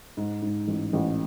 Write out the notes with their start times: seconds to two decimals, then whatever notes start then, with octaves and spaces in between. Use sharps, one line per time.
0.17 G#2
0.42 G#2
0.68 A1
0.93 A1